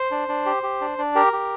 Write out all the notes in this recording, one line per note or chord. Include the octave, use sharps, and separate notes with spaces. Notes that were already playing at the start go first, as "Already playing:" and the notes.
Already playing: C5
D4
D4
G4
G4
D4
D4
G4 A#4
G4